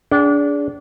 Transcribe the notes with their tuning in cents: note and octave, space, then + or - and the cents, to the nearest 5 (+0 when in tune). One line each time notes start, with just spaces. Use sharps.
D4 -25 G#4 +0 G5 -45